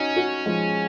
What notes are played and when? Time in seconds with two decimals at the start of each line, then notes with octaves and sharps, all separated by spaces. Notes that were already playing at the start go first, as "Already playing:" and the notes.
Already playing: C#4 D#4 F#4
0.16 D#4 F#4
0.46 F3 G#3